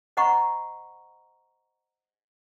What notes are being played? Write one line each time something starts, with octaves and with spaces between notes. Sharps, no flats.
C5 D#5 F#5 A#5 B5 C#6